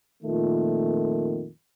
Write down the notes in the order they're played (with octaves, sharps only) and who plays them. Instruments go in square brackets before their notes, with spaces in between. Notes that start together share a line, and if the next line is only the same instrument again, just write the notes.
[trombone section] F2 A#2 D#3 A3 F4